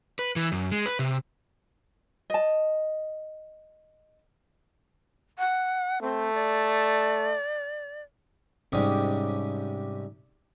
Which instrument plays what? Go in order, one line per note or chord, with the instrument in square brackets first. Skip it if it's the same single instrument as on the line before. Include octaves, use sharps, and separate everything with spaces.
[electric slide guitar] B4
E3
F#2
G#3
B4
C3
[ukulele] D#5 A5
[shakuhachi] F#5
[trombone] A3 [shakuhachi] C4
[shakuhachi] D5
[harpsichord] G#2 C3 G3 C#4 G4 D#5